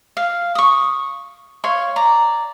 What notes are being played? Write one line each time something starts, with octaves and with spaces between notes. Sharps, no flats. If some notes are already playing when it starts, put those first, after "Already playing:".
F5
C#6 D#6
C#5 F5 C6
D5 A#5